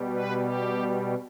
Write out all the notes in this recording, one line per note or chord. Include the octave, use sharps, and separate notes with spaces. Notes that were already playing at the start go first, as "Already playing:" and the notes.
Already playing: B2 G3
B4
G4